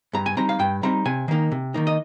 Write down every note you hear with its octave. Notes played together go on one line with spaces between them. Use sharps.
G2 A#5
G#5
G3 C4 D#4 A#5
F5
G2 G5
G3 C4 D#4 A#5
C3 G#5
D#3 A#3 D#4
C3
D#3 A#3 D#4
D#5